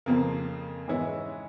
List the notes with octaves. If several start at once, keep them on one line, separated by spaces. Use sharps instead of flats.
F2 C#3 F3 A#3
G#2 E3 G#3 C#4 E4